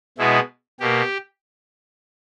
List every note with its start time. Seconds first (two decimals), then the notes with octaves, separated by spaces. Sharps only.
0.18 B2 G#3 B3 E4
0.80 B2 A#3 G4